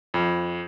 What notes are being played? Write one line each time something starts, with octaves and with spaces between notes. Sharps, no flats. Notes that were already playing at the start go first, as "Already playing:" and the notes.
F2